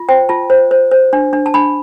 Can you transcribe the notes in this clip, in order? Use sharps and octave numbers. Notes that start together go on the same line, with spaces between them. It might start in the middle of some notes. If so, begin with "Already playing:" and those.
Already playing: F4
C5 G5
F4 A5
C5
C5
C5
D4
D4
A5
D4 B5